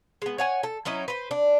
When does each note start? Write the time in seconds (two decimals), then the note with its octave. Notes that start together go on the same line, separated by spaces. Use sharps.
0.22 G#3 B3
0.38 C#5 F#5 G#5
0.63 A4
0.85 F#3 C#4 D#4 E4
1.08 B4 C5
1.31 D4